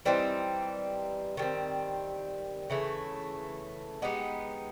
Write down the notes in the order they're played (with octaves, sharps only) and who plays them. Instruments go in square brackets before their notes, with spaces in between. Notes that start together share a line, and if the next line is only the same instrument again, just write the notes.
[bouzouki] E3 G3 C4 D#4
D#3 G3 C4
C#3 E3 A3
G#3 B3 D#4 G4